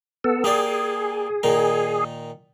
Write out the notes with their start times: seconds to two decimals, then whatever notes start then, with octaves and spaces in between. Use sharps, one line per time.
0.24 B3 A4
0.44 A#3 G4 G#4 D5
1.43 A#2 D#3 D#4